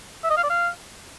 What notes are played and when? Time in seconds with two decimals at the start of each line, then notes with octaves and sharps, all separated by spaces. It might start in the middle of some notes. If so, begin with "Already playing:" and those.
0.24 E5
0.30 D#5
0.37 F5
0.44 D5
0.50 F5